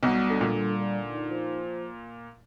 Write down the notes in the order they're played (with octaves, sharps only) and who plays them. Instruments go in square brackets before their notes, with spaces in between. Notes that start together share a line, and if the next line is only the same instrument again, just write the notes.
[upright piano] B1 B2 [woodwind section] G3
[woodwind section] D3
[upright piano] A#2
[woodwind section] G3
D3
D#4
F3